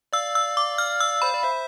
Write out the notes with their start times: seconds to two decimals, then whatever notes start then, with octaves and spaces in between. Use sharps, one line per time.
0.13 D5 F5 E6
0.35 E6
0.57 D6
0.78 F6
1.00 E6
1.22 C5 B5
1.34 D5
1.43 C5 E5